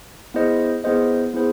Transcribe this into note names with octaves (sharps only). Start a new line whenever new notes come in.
B3 E4 G#4 C5 D#5
B3 E4 G#4 C5 D#5
B3 E4 G#4 C5